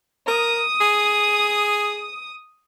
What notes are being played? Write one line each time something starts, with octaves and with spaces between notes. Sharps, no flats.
A#4 D#6
G#4